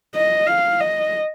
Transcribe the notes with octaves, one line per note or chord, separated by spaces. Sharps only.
D#5
F5
D#5